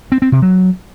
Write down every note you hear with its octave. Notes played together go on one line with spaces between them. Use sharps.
C4
C4
C3
F#3